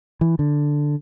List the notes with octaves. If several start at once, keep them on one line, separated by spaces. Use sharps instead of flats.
E3
D3